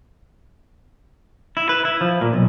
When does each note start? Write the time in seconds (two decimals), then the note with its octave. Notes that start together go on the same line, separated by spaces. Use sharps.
1.57 E4
1.69 B4
1.85 E4
2.01 F3
2.21 A#2
2.33 B1